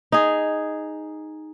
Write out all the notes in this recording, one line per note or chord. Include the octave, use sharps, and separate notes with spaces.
D#4 G#4